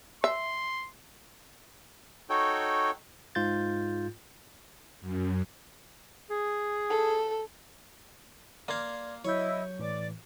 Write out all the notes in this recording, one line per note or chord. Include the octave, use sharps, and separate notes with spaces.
E5 C6
D#4 F#4 A4 C#5 G5
G#2 F4 G6 A6
F#2
G#4
A4
A#3 D5 F5 C6 G#6
F#3 E4 C#5 D#5 G6
A2 E3 D5 D6